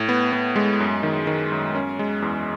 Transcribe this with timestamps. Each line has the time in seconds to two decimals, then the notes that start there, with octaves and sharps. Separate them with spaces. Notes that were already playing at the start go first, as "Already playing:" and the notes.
Already playing: A2
0.09 B3
0.32 B3
0.56 G#3
0.80 F#2
1.03 D#3
1.27 D#3
1.52 F#2
1.75 C#4
1.99 G#3
2.22 E2